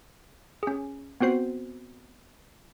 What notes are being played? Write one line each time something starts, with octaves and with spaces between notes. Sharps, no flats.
C#4 G#4
B3 C4 F#4 C5 C7